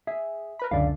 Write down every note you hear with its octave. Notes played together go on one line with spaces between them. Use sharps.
G#4 E5
A#4 B4 B5
C#2 F#2 D3 D5 F5